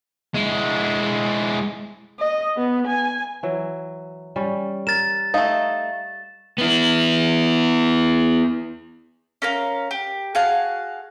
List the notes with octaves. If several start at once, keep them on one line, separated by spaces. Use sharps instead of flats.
G#3 E4
D#5
B3
G#5
E3 F#3
G3 C#4 G4
A#4 A6 E7
A3 D#4 F5
B3 E4
C#4 A#4 F5
G4
F#4 G#4 F5 A5